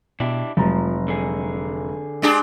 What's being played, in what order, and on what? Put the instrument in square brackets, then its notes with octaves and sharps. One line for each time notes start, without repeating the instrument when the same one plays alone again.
[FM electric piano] B2 [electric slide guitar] D4 E4 G4
[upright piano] F1 A#5 [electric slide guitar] F3 [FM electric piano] F#3 G#3
[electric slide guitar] D3 G#4
[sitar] G#3 D4 G4